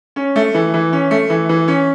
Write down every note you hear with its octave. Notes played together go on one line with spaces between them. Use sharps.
C#4
A3
E3
E3
C#4
A3
E3
E3
C#4